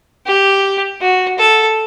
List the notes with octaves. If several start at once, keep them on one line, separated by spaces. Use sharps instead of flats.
G4
F#4
A4